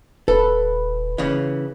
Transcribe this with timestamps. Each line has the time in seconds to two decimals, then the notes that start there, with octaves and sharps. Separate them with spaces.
0.28 D#1 A4 B4
1.18 C#3 E3